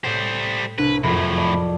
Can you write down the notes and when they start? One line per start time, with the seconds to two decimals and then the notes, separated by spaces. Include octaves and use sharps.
0.04 A2 G3 C5 G5
0.78 C2 D4 B4
1.03 F#1 F2 A2 C3 B5
1.37 D5 D#5 A5